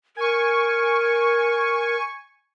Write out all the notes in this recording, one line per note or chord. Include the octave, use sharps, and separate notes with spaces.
A#4 G#5 C#6